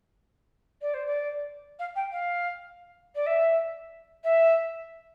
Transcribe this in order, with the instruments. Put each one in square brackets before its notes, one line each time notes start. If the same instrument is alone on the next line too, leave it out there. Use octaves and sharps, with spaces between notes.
[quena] D5
C5
D5
F5
G5
F5
D5
E5
E5